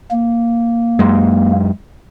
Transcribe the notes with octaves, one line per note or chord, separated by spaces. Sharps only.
A#3
F#2 G#3